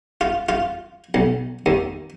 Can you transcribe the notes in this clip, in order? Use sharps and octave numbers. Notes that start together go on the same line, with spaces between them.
F4
F4
B1
D#2